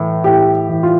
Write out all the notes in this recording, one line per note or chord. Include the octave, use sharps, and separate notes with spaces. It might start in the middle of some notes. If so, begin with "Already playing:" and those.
Already playing: A2 E3
A2 G4
E3
F4